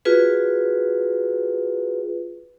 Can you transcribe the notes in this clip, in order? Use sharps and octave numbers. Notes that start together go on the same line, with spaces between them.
F4 F#4 G#4 B4